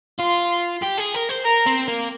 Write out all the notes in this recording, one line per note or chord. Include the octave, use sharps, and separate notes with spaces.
F4 C6
G4
G#4
A#4
C5
A#4 A#5
C4
A#3